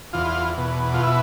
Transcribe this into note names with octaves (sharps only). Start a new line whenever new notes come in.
E2 F4
B2
F4
E4